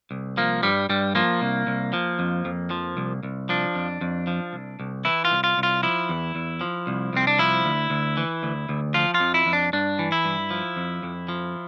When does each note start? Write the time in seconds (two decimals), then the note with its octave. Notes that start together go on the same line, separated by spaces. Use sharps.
0.11 C2
0.37 F3 A#3
0.63 G2 G3
0.89 G2 G3
1.15 F3 A#3
1.42 C2
1.67 C2
1.93 F3
2.19 F2
2.45 F2
2.70 F3
2.97 C2
3.23 C2
3.49 F3 D4
3.75 F2
4.01 F2
4.27 F3
4.53 C2
4.80 C2
5.05 E3 E4
5.25 F4
5.31 C2
5.44 F4
5.58 C2
5.63 F4
5.83 F3 E4
6.09 E2
6.35 E2
6.61 F3
6.87 C2
7.13 C2 C4
7.27 D4
7.39 F3 E4
7.65 D2
7.90 D2
8.17 E3
8.43 D2
8.69 D2
8.94 F3 F4
9.14 F4
9.20 F2
9.34 E4
9.47 F2
9.53 D4
9.73 G2 D4
9.99 E3
10.12 E4
10.25 G2
10.51 F3
10.76 F2
11.03 F2
11.28 F3